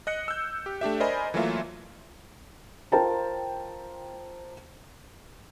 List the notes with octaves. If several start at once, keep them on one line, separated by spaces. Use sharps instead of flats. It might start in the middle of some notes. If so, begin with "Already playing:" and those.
D#5 F#6 C#7
E6 G6
G4
A3 D4 G4 E5
A#4 C5 D5 D#5 G#5 B5
E3 F#3 A3 A#3 F4 E5
F4 A#4 C5 G5 A5 A#5